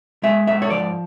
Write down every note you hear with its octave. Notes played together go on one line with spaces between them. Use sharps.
G#3 E5
G#2 E5
C#5
F3 D5